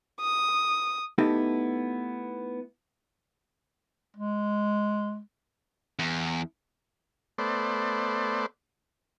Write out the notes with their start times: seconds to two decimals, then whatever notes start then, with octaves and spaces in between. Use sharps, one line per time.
0.21 D#6
1.18 A3 B3 D#4 E4 G4 A4
4.16 G#3
5.99 E2
7.38 A3 B3 C5 D5